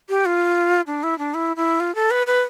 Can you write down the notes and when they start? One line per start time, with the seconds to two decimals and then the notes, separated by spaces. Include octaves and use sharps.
0.09 G4
0.25 F4
0.87 D4
1.03 E4
1.18 D4
1.34 E4
1.56 E4
1.80 F4
1.95 A4
2.11 B4
2.27 B4